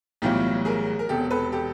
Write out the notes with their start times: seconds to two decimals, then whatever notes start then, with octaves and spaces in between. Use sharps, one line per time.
0.22 B1 A2 E3 G3 F4 G4
0.65 G#4 A#4
0.99 A#4
1.09 E1 E2 C3 G4 A4
1.31 A4 B4
1.52 G4 A4